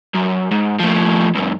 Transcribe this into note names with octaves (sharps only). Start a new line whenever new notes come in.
F#2
G#2
A2 F3
C#2 F#2